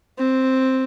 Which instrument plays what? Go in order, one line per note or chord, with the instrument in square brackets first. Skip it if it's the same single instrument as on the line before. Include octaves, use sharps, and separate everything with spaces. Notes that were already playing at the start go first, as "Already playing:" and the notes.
[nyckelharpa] C4